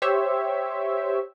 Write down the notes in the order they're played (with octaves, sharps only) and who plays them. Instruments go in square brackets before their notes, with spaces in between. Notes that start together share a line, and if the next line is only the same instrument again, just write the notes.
[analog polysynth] G4 C5 C#5 E5